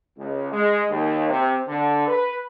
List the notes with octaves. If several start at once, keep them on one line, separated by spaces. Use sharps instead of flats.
C#2
G#3
D#2
C3
D3
B4